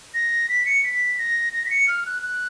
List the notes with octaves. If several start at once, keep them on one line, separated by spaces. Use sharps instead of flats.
A#6
B6
C#7
B6
A#6
A#6
B6
C#7
F6
F#6
F#6